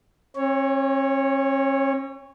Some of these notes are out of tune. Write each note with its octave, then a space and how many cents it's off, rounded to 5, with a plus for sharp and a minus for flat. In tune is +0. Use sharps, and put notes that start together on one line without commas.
C#4 -45 C#5 +0